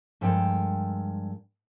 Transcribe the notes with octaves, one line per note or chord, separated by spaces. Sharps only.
G2 F3 G#3 A4 A#4 G5